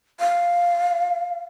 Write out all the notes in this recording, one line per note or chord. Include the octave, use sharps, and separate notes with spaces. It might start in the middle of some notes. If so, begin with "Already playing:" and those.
F5